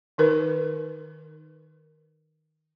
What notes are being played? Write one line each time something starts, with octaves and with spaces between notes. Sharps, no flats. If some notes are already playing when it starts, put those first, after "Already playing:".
D#3 D#4 A#4 B4